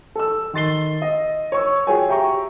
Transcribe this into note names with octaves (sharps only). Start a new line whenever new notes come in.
A4 E6
D#3 C6 A6 C7 G7
D#5
C#5 C#6 E6
F4 F#4 G#4 C#5 G5 G#5
G4 E5 G5 A#5 C#6